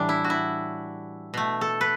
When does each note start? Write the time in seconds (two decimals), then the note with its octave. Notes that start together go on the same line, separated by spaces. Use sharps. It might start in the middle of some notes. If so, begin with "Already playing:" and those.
Already playing: A2 E3 G3 D4
0.09 E4
0.24 F#4
0.30 E4
1.34 B2 A3
1.61 A4
1.81 B4